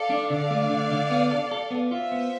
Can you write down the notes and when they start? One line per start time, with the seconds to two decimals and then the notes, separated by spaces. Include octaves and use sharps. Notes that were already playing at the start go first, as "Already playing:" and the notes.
Already playing: A4 D5 F5
0.10 D4
0.30 D3 D5 F5
0.51 A3
0.70 D3
0.91 D3
1.10 B3
1.31 A4
1.51 A4
1.71 B3
1.91 F4 C5 E5
2.12 B3